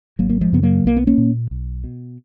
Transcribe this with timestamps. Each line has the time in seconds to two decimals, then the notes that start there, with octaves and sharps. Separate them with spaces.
0.19 G#1 F#3 A#3
0.30 A#3
0.41 F3 G#3
0.52 F#2 C#3 B3
0.63 F#3 A#3
0.85 B1 A#3
0.97 B3
1.07 A#3 C#4
1.18 A#2
1.51 B1
1.84 B2